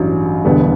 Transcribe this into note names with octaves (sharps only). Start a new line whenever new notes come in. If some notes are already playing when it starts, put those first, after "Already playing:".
Already playing: A1 G2 F#3
E1 D2 D3 G3 B3